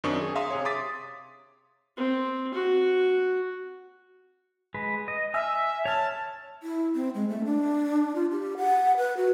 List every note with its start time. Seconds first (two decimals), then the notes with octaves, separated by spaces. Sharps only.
0.04 F#2 D#3 C4 D4 C#6 D#6
0.21 G#4
0.35 E5 F5 A#5 C6 D#6
0.50 C3 G#4 C#5
0.65 C6 D6 D#6 A6 B6
1.97 C4
2.54 F#4
4.74 G#3 B4
5.08 D#5
5.34 E5 G#5 E6 F6
5.85 C#5 A5 F6
6.63 E4
6.95 C4
7.15 G#3
7.29 A3
7.45 D4
8.15 F4
8.32 G4
8.57 F#5
8.97 B4
9.17 F#4